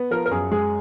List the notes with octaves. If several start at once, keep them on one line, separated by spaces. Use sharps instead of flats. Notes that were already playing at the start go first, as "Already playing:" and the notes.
Already playing: B3
F3 A#4
A#4
F#2 G#4
G#3 G#4